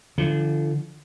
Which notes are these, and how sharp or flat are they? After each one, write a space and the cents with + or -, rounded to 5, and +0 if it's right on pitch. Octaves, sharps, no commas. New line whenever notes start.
D3 +0 F3 -35